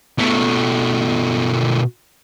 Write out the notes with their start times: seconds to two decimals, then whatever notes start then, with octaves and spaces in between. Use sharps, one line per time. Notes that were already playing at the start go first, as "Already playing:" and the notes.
0.18 B2 A3